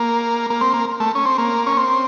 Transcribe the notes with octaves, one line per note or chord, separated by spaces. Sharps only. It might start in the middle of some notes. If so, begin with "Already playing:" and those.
Already playing: A#3
A#3
C4
A#3
A3
C#4
C4
A#3
C#4
C4